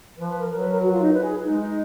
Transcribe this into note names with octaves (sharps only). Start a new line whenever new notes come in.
F3 B4
B4
A#4
F#3 A#4
B4
A#4
F#4
F4
D#4
B4
G#4
G#3 D#4
F4
D#4